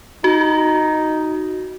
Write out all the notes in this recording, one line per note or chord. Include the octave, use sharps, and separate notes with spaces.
D#4 F#4